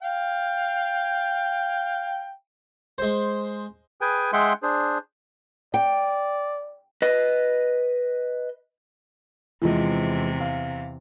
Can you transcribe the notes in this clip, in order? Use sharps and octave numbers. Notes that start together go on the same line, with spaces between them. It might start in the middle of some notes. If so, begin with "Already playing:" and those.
F5 G5
G#3 C5
G#4 B4 G5 G#5
G#3 G#4 E5 F#5 G5 C6
D4 G#4 C5
D5 G5
B4 D#5
E2 C3 E3 F3 G#3
F5